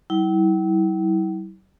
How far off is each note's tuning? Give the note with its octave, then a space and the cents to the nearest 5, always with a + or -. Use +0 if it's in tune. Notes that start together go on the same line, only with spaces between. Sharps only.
G3 -45 E4 -30